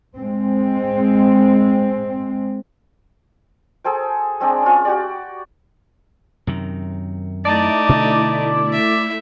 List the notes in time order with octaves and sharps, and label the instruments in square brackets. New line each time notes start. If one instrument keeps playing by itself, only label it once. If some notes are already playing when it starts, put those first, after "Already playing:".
[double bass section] G#3 C4
[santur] G#4 A4 C5 G5
G#3 C4 D4 D5
C#4 F4
F#4 G4 D5
[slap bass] F#2 C3 D#3
[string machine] A3 E4 [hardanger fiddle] D#4 A5 [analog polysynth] D5
[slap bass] B2 D3 D4
[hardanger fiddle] E5